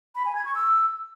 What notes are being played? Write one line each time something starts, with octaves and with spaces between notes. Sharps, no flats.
B5
G#5
G#6
C#6
E6